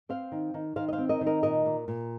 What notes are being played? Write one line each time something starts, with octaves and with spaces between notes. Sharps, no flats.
C4 C5 F5
D#3
D#3
D#3 C5 F5
D#5
C5 F5
C4
A#4 D#5
D#3
A#4 D#5
A#2 A#4 D#5
A#2
A#2